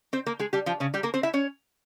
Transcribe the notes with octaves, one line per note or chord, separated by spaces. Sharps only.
C4 C5
A#3 A#4
G#3 G#4
G3 G4
F3 F4
C#3 C#4
G3 G4
A#3 A#4
C4 C5
E4 E5
C#4 C#5